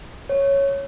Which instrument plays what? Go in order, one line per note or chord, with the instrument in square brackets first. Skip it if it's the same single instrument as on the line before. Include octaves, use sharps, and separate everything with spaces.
[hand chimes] C#5